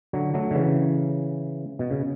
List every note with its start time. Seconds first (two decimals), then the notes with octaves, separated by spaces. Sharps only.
0.13 D3 F#3
0.34 F#3 A3
0.51 D3
0.55 C#3 E3
1.79 B2
1.91 C#3